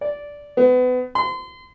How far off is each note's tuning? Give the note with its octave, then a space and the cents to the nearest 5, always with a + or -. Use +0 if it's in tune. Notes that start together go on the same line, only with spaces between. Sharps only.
D5 -10
B3 +30
C6 -35